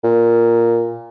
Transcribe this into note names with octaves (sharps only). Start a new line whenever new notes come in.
A#2